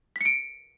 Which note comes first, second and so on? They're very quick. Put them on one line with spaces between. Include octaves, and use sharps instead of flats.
B6 C#7 D7